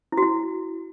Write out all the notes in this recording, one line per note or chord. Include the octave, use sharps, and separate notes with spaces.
E4
F#4
E4